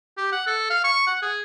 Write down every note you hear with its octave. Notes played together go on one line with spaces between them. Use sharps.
G4
F#5
A4
F5
C#6
F#5
G#4